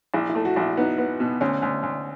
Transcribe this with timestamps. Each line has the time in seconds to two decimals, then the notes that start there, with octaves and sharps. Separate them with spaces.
0.14 A#1 E4
0.29 E4
0.35 A3
0.45 F#4
0.56 A#1
0.62 E4
0.77 B3 D#4
0.98 B3
1.20 B2
1.41 D2 C#4
1.62 D2
1.83 D2